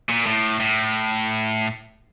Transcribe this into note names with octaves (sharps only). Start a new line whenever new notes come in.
A#2
A2
A2